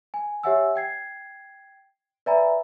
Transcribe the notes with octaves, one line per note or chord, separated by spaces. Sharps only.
G#5
G4 C#5 E5 F#5 G#5 E6
G5 G#6 C7
B4 D5 E5 G#5 A#5 B5